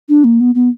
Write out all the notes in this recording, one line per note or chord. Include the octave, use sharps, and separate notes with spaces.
D4
A#3
B3
B3